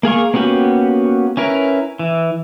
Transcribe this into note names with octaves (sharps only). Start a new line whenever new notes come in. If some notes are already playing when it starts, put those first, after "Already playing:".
A#3 G#4 F5 C#6
A#3 B3 C#4 F#4 G4
C#4 E4 A#4 B4
E3